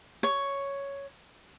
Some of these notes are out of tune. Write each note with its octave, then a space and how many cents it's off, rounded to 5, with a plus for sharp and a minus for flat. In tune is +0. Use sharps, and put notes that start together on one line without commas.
C#5 +5